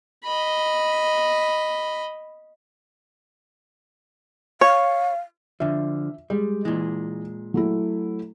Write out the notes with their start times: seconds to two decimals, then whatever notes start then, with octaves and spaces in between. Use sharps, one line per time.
0.24 D#5 B5
4.61 C#5 F5
5.60 D3 F3 E5
6.30 G3 G#3
6.65 A#2 E3 G#3
7.54 F#3 A3 E4